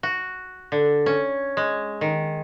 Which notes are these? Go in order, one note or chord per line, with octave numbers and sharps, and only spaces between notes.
F#4
D3
C#4
G#3
D#3